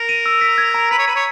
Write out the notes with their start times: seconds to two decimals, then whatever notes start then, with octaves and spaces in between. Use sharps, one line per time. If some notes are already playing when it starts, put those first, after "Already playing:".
Already playing: A#4
0.09 D#7
0.26 E6
0.41 B6
0.58 G#6
0.74 A#5
0.91 B4 B6
0.99 C#5
1.08 B4 D#7
1.16 C#5